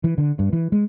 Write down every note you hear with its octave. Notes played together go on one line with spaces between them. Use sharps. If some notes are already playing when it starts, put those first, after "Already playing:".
E3
D3
G2
E3
G#3